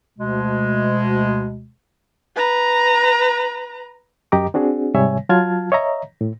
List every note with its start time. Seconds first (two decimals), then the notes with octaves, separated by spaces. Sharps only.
0.19 D2 B2 G#3
2.36 B4 A#5
4.32 F#2 G4 D#5 A#5 D6
4.54 C4 D4 F#4 G#4
4.94 G#2 C3 G3 C#5 E5 G#5
5.29 F#3 F4 A5 F6 G#6
5.72 C#5 D#5 E5 A#5
6.21 A2